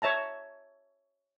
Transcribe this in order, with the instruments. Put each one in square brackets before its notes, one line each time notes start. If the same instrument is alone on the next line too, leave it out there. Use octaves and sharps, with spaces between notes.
[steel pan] C#5 E5 A5 A#5